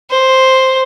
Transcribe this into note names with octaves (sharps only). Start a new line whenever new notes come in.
C5